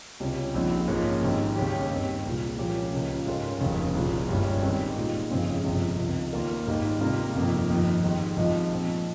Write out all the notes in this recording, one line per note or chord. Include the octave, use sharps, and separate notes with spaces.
C#2 C3 G3 C#4
A#1 A#2 G#3 C4 D#4
G#2 F3 A#3 C#4
G#1 G#2 G3 C4
D#2 C#3 G3 C#4 G4
G2 G3 C4 D#4
C2 A#2 G#3
A#2 F3 A#3 C#4 G4
C#2 C#3 G#3
G#2 G3 C#4 F4 A#4
F1 D#2 C#3
C2 A#2 G#3
G1 G2 G3 C#4
G#2 D#3 G#3 C4 G4
A#2 G#3 D#4
G1 F2 C#3 G#3 C4
G1 F2 C3
C#2 C3 D#3
D#2 D#3 A#3 F4 A#4
G#1 G#2 G3 A#3 D#4
C3 G3 A#3 F4 A#4
G1 F2 C3 D#3 A#3
G1 F2 D#3
G#2 D#3 G3
G#1 G#2 F3 C4 D#4
A#2 F3 C4